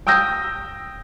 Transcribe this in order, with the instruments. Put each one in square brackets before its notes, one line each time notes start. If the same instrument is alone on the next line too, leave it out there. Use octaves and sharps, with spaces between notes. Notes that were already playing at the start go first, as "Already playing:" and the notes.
[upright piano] G5 D#6 E6 G6 A#6